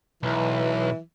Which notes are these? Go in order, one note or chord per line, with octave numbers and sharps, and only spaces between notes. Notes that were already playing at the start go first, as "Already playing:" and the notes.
B1 E3